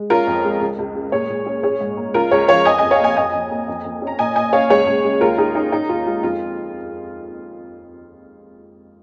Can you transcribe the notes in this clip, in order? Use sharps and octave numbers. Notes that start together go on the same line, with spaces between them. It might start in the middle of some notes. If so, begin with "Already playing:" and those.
Already playing: G#3
C#4 F4 A#4
F2
G#3
C#2
C#2
G#3
A#2 G#4 C#5
A#2
C#4
C#4 G#4 C#5
G#2
A#3
C#2 F4 A#4
C#2 G#4 C#5
F3 C#5 F5
F2 D#5 G#5
F2 D#5 G#5
C#5 F5
A#3 D#5 G#5
F2 D#5 G#5
F2
A#3
F2
F2
C#4
A#5
A#2 D#5 G#5
A#2 D#5 G#5
C#4 C#5 F5
C#2 G#4 C#5
C#2
G#3
D#2 F4 A#4
D#2 D#4 G#4
C#4 D#4
C#4 D#4
D#2 F4
G#3 F4
F2 F4